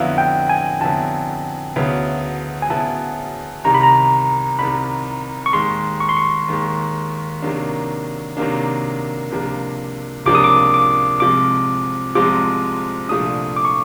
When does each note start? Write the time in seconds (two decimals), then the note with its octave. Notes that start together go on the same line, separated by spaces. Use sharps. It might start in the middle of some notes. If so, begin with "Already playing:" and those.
Already playing: F2 D3 F#3 B3 E4 F5
0.18 G5
0.49 G#5
0.81 F2 D3 F#3 B3 E4 A5
1.76 D2 C#3 F#3 B3 E4
2.62 G#5
2.70 D2 C#3 F#3 B3 E4 A5
3.64 C2 C3 D#3 A#5
3.74 B5
3.83 A#5
4.59 C2 C3 D#3 B5
5.46 C#6
5.53 D#2 D#3 G#3 C6
6.00 C#6
6.09 C6
6.17 C#6
6.48 D#2 D#3 G#3
7.42 C3 D#3 F#3 A#3 D4
8.37 C3 D#3 F#3 A#3 D4
9.31 C#2 C3 F3 A#3 D4
10.26 C#2 C3 F3 A#3 D4 D6
10.35 D#6
10.44 D6
10.74 D6
11.20 C2 C3 F3 G#3 C4 D6
12.15 C2 C3 F3 G#3 C4 D6
13.09 C2 A#2 F3 A3 D4 D#6
13.56 D6
13.65 C#6